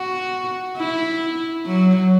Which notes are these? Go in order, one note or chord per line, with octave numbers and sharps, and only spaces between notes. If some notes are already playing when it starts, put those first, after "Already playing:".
Already playing: F#4
E4
F#3